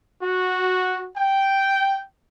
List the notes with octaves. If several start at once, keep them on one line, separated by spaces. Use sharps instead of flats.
F#4
G5